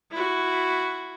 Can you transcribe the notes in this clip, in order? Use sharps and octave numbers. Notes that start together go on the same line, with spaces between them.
E4 F#4